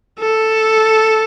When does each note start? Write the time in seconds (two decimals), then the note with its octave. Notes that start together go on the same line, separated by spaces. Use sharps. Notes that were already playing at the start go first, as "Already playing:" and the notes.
0.19 A4